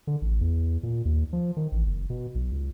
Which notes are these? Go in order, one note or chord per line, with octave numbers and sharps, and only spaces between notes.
D3
A1
E2
A#2
D#2
F3
D#3
A1
F#1
B2
B1
C#2